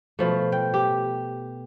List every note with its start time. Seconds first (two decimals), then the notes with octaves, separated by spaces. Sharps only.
0.19 B2 F3 A3
0.52 G5
0.74 G4